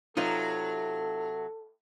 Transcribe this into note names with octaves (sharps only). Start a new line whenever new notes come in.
C3 F#3 D#4 F4 A4 B4